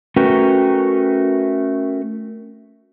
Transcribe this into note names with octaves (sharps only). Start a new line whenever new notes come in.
A3 C#4 F#4 A#4 B4 G5